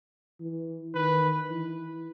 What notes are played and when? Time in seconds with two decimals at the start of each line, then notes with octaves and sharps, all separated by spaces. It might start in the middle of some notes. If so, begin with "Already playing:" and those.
0.40 E3
0.95 D#3 B4
1.50 E3